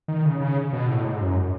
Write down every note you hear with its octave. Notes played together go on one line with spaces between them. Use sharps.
D#3
C#3
C#3
B2
A2
G#2
F#2